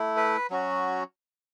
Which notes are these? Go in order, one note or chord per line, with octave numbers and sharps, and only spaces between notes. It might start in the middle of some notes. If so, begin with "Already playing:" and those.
Already playing: A3 E4
B4
F#3 C#4 F#4